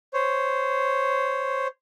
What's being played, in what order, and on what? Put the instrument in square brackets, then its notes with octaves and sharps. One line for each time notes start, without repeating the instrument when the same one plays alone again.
[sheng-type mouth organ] C5 C#5